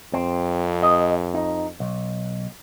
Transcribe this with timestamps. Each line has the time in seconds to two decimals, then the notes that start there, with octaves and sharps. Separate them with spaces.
0.14 F2 C4
0.83 D#5
1.34 D#4
1.80 B1